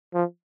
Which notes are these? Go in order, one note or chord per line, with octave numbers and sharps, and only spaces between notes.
F3